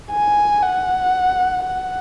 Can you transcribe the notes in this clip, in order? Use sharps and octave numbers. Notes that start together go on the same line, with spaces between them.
G#5
F#5
F#5